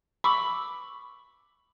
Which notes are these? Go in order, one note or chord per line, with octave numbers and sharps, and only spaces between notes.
B5 C#6 D6 E6